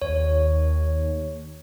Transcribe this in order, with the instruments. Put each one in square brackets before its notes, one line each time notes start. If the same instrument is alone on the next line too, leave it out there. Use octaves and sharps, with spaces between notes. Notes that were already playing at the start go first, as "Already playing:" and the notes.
[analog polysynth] D#2 [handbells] C#5